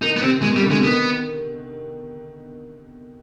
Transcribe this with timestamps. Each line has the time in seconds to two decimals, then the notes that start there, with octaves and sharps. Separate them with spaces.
0.02 D#3 D#4
0.16 B3
0.22 C3 C4
0.42 B2 G#3
0.53 C3
0.56 G3
0.63 D3
0.71 C3 G#3
0.83 D#3 B3